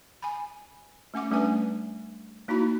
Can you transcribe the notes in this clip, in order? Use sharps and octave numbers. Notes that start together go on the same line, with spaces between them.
G#5 B5
A3 C#4 F#5 D6
G3 A3 C#4 D4 B4 G#5
A#3 D#4 E4 F#4 B5